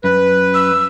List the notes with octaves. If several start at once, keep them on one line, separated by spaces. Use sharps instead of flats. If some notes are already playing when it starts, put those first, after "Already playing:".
F#2 B4
E6